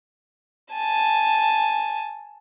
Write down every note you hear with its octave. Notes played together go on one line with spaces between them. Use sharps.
G#5 A5